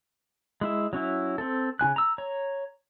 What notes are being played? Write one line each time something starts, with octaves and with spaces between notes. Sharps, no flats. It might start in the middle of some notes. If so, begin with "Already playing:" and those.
G#3 E4 E5
F#3 C#4 E4
C4 A4
C#3 F4 G#5 F#6
A#5 E6
C#5 A#5